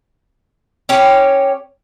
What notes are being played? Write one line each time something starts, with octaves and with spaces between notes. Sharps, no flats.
C#4 G4 C#5